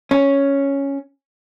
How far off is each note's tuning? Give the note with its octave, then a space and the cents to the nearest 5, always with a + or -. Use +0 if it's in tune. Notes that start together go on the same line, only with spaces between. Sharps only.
C#4 +0